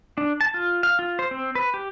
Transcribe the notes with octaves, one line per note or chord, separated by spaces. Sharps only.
D4
A5
F4
F5
F4
C5
C4
B4
G4